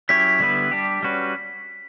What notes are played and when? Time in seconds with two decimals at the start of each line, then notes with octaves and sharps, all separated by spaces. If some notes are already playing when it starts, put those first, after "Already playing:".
0.09 F#3 C#4 E4 G4 C#5 B6
0.40 D3 G3 B3 E4 B4
0.71 G3 D4 G4
1.03 G3 C#4 F#4 B4